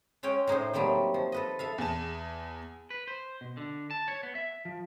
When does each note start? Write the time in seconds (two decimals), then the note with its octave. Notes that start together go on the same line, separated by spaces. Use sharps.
0.23 G#3 C#4 C#5 G5
0.47 A2 D#4 G#4 C5
0.73 F#3 G3 A3 A#3 C4
1.14 F3
1.32 A4 B4 D#5
1.59 A4 E5 F5
1.78 E2 G#4 A5 E7
2.90 B4
3.08 C5
3.41 B2
3.57 D3
3.91 A5
4.08 C#5
4.23 B3
4.35 E5
4.65 F3